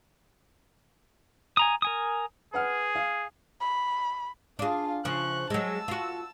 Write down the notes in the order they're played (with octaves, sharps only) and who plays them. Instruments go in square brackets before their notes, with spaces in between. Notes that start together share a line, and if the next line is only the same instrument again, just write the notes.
[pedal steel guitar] G#5 A#5 D#6
A#4 G#5 D#6
[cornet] G#4 [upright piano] B4 F#5 F6
[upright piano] F5
[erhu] B5
[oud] D4 G#4 [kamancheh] F4 F5
[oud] C#3 F3 [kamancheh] C#6 F#6
[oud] F#3 G#3 [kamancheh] A5 E6
[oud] F4 F#4